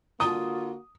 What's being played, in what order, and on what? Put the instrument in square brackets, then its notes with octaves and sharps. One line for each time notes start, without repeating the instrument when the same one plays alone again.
[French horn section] D3 A#3 F#4 [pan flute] F4 [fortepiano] D#6